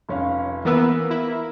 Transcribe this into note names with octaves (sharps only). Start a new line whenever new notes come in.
F1 C#4 F5
E3 A#3 B3 A#4 B4 E6
E4